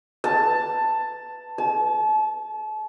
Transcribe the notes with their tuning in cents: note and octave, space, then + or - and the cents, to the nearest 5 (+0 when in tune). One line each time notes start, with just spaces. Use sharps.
A5 +10
A5 -35